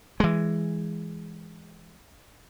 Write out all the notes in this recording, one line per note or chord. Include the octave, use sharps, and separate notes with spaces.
E3 G#3